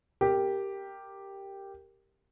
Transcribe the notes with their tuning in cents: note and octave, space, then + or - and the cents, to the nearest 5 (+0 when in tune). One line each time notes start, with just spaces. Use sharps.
G4 +0 A#4 -10